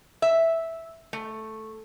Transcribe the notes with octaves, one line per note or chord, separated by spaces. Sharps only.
E5
A3